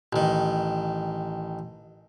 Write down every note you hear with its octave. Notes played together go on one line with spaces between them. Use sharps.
A1 D#3